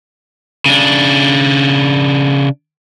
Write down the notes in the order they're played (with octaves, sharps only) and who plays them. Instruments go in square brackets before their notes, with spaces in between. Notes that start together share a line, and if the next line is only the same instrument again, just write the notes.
[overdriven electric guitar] C#3 D4